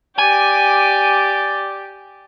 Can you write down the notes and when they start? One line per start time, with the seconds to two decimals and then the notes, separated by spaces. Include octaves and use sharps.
0.18 G4 D5 G#5